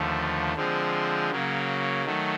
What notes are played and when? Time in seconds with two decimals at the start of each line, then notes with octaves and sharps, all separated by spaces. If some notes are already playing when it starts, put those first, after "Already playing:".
Already playing: D#2 D3 F3 A3
0.55 D3 F3 G#3 C4
1.31 C#3 F#3 A#3
2.05 D#3 F#3 A3